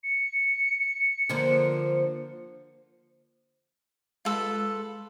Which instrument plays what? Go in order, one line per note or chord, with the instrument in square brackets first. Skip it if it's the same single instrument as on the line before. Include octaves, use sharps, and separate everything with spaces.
[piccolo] C#7
[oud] D3 F3 A#3
[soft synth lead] G#3 [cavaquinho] F4 A4 B4